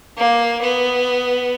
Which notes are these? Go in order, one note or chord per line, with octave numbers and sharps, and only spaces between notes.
A#3
B3